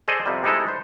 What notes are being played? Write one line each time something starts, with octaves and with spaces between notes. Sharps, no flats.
G#4 A4 C5 D5 D#5
F2 C3 G3
C3 G3 G#3 D#4 E4 A4
B4 C5